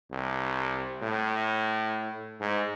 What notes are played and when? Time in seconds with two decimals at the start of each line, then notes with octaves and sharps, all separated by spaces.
0.12 C2
1.03 A2
2.41 G#2